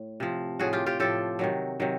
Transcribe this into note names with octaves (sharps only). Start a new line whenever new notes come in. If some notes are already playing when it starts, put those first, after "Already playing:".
Already playing: A2
C3 F3
A2 F3 F#4 G#4
F4 G4
F4 G4
A2 F3 G4 A4
C3 D#3 F#3
C3 D#3 F#3